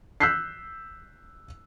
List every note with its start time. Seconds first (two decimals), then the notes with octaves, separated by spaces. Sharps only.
0.20 E6 F#6 G6 B6 C7